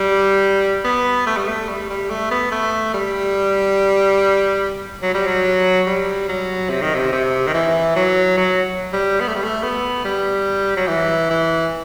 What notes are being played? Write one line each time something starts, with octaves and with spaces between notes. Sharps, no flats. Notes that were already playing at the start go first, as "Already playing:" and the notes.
Already playing: G3
B3
A3
G3
A3
G3
G3
A3
B3
A3
G3
F#3
G3
F#3
G3
F#3
C3
D#3
C3
C3
D#3
E3
F#3
F#3
G3
B3
A3
G3
A3
B3
G3
F#3
E3
E3